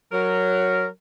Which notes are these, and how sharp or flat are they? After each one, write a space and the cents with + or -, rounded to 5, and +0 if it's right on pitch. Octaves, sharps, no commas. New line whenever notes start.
F#3 +0 A#4 -10